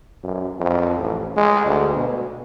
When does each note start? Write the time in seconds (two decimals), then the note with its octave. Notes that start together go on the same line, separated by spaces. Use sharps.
0.23 F#2
0.59 F2
0.98 A1
1.36 G#3
1.66 D2
1.96 B2